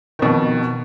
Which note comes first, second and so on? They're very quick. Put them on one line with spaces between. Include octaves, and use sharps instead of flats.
D#3 B2 F2